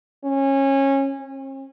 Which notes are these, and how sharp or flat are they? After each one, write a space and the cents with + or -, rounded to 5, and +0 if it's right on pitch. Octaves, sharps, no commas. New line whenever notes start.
C#4 -20
C#4 -45